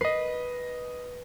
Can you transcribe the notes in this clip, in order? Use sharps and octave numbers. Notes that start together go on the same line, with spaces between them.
B4 D#5 C7